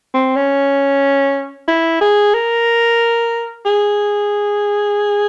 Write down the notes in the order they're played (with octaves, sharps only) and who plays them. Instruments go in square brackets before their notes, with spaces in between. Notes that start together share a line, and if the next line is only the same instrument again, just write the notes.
[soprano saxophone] C4
C#4
E4
G#4
A#4
G#4